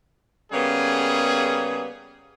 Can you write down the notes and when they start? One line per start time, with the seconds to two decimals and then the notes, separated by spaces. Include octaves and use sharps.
0.53 C#3 G3 A#3 B3 C#4 G#4